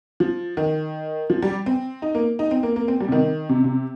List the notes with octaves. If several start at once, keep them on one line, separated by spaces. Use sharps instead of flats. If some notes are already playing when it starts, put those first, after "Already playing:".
F3
D#3
F3
G3
C4
D#4
A#3
D#4
C4
A#3
A#3
C4
G3
C3
D#3
C3
C3